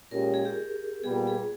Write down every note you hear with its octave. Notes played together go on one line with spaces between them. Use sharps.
A#2 G#3 C#4 G4 A#4
G#4
G4
A#2 G3 B3 G#4
G#4